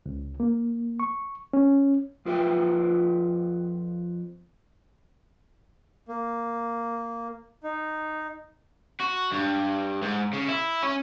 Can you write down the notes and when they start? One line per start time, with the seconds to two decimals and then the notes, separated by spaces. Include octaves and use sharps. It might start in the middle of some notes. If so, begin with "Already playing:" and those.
0.06 C#2
0.40 A#3
1.00 C#6
1.53 C#4
2.25 F2 F4 B4 E5 G5
6.08 A#3
7.64 D#4
9.01 F#4
9.33 G2
10.02 G#2
10.33 C#3
10.48 E4
10.83 C#4